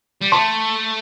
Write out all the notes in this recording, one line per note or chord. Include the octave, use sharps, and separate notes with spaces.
G3
A3 A5 C6